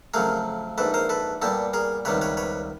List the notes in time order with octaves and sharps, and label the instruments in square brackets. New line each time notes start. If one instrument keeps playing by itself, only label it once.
[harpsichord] F2 C#3 F#3 A3 G#4 A#4
A#1 G#2 E3 A4 B4
A#4 C5
A4 B4
A#2 G3 B3 G4 A4
G#4 A#4
C#2 C3 D#3 G3 B3 B4 C#5
B4 C#5
B4 C#5